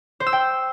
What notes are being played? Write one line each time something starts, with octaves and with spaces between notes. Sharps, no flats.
C5
E6
G5